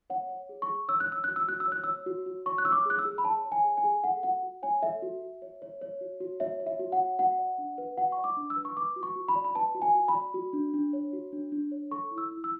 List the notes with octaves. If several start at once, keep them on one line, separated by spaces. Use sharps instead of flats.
C#5 F#5
C#5
G#4
C#6
G#4
C#5 E6
F#6
C#5 E6
F#4 F#6
E6
F#4 F#6
E6
C#5 F#6
C#5 E6
F#4
F#4
C#5 C#6
F#6
C#5 E6
D6
G#4 F#6
E6
G#4
B5
C#5 A5
C#5
G#5
G#4
G#5
G#4
A4 F#5
F#4 F#5
F#4
C#5 G#5
A4 E5
F#4
F#4
C#5
C#5
C#5
F#4
F#4
C#5 E5
C#5
E5
F#4
F#5
F#4
F#4 F#5
D5
D4
B4
F#4 F#5
C#6
D5
D6
D4
E6
B4
C#6
B4 D6
F#4
C#6
F#4
B5
D5
B5
B4 A5
F#4
G#5
F#4
B5
D5
F#4
D4
D4
C#5
F#4
D4
D4
C#5
A4 C#6
E4
E6
E4
E6